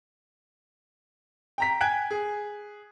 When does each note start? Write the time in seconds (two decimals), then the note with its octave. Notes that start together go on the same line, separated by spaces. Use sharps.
1.58 G5 A#5 B6
1.81 G5 G#5 F#6 G#6 D7
2.11 G#4